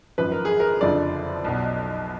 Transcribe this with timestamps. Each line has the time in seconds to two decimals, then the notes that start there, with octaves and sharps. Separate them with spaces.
0.18 G#1 F#2 F3 B4
0.32 A#4
0.45 G#4
0.60 A#4
0.81 F#1 F2 D3 F3 D5
1.44 B1 B2 F#3